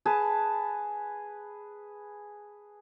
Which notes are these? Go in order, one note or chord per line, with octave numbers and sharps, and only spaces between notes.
G#4 B4 A5